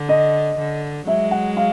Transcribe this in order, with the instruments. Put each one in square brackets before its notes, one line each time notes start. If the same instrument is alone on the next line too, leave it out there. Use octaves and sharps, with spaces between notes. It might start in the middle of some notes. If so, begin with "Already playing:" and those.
Already playing: [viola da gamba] D3
[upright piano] D#5
[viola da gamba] D3
[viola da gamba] F#3 G#3 [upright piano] E5
[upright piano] F#5
F5